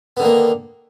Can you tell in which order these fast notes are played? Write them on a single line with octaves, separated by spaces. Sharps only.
B3 D3 D#3 A#3